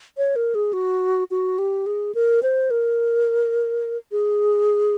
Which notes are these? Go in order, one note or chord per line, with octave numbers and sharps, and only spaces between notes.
C#5
A#4
G#4
F#4
F#4
G4
G#4
A#4
C5
A#4
G#4